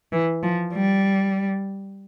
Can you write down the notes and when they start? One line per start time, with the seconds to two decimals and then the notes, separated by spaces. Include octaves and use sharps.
0.12 E3
0.43 F3
0.73 G3